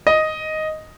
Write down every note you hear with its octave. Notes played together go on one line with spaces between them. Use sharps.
D#5